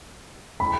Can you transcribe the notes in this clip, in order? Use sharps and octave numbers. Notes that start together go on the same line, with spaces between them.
B5